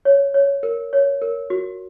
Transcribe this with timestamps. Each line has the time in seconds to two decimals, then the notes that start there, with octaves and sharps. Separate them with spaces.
0.05 C#5
0.34 C#5
0.63 A#4
0.93 C#5
1.22 A#4
1.50 F#4